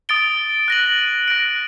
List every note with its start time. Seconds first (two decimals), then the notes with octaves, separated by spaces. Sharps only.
0.09 D#6 A6 D7 G7
0.68 F#6 A#6 D#7 F#7
1.28 F#6 A#6 D7